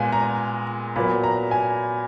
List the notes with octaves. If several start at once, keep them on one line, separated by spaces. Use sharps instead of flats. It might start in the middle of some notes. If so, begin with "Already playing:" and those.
Already playing: A#2 G#3 B3 G#5
A#5
A#2 F#3 B3 B5
A#5
G#5